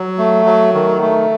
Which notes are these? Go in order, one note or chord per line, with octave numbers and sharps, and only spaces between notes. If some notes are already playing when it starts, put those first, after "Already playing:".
Already playing: F#3
A3
F#3
D#3
A3